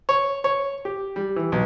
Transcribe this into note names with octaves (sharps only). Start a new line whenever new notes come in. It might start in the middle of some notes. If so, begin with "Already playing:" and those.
C#5
C#5
G4
G3
E3
B1